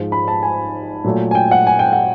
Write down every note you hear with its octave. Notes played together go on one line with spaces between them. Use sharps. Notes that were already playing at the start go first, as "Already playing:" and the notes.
Already playing: G#2 F3 G#3
B5
A5
G#5
A#2 F#3 A3
G#5
G5
F#5
G#5
G5
F#5